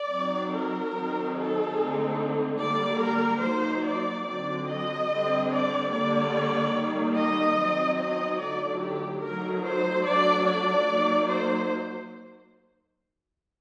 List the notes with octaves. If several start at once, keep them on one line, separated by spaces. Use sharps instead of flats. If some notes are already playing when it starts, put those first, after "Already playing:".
Already playing: D5
F#3 C4 D#4
A#4
D#3 F#3 C4 D#4
A4
D3 A3 C4 D#4
D3 G3 A#3 D5
A#4
F#3 A#3 D#4 C5
D5
D3 F#3 C4 D5
D#5
D3 G3 C4
D5
D3 G3 A#3 D5
D#3 G3 A#3 D#4
D#5
F#3 C4 D#4
D#5
D3 F#3 A3 D#4 D5
G4
F#3 A3 D#4 A#4
C5
F#3 A3 D4 D5
D5
F#3 A#3 D#4
C5